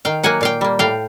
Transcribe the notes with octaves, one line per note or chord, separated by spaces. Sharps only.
D#3 F5 G5
F#3 A#3 F#5 G#5
A#2 F5 G5
G3 A#3
A2 F5 G5